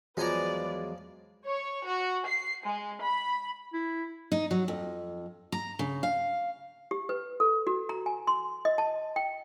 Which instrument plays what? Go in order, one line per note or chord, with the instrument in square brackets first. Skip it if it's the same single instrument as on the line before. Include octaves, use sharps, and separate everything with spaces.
[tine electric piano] E2 F#3 G#3 [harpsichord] F3 G#5 A#5 [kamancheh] B4 D5
[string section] C#5
F#4
C7
G#3
B5
[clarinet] E4
[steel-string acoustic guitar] D#4
F#3
F2
A#5
C#3
F5
[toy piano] G4
B4
A4
F#4
A#5
G#5
C6
D#5
A5
G5